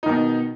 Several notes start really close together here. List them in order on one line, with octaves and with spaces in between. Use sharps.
D#4 D#3 B2